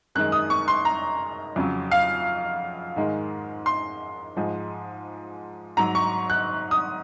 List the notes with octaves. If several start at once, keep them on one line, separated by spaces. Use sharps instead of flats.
F#2 D#3 G#3 F#6
D#6
C#6
C6
A#5
F2 C#3 F#3
F5
G#2 D#3 G#3
C6
G#2 F3 G#3
G#2 F#3 A#5
C#6
F#6
D#6